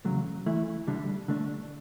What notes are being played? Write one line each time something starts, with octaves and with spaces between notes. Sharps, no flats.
E2 C#3 F#3 A3
E3 A3 E4
D2 D3 G3
D3 A3 D4